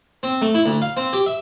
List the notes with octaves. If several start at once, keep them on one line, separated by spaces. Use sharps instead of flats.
C4
A3
E4
D2
F5
C4
G4
E5